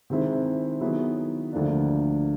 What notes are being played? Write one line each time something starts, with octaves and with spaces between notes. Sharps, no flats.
C3 D#3 G#3 C4 E4
D#3 F#3 B3 E4 G#4
D2 D3 F3 A#3 D4